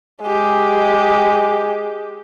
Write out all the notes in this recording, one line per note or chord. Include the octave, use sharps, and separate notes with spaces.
G#3 G4